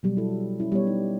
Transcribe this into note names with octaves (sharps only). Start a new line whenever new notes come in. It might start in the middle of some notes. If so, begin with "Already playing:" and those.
B2 F#3 G3
E4 A4
C#4 E4
G3 B3 C#5
D#4